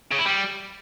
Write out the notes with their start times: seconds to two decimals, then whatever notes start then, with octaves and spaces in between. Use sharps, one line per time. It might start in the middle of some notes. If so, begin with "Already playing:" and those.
0.12 C#3
0.19 E4
0.26 G3